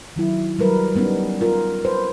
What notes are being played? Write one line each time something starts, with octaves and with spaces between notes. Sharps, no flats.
D#3 F#3 E4
F#3 G3 A#4 B4
G3 B3 C#4 D#4
F4 A#4
B4 C5